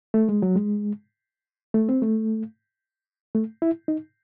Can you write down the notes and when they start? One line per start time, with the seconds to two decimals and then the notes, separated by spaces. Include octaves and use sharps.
0.14 A3
0.29 G#3
0.42 F#3
0.56 G#3
1.74 A3
1.89 C4
2.02 A3
3.35 A3
3.62 E4
3.88 D#4